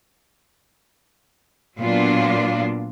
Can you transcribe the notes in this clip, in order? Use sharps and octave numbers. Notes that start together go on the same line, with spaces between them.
A#2 F#3 A#3 B3 D4 F4